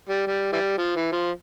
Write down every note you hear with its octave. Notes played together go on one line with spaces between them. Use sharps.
G3
G3
E3 G3
F3
E3
F3